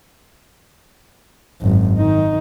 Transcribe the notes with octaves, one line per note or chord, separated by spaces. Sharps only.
G#1 F#2
D#3 D#4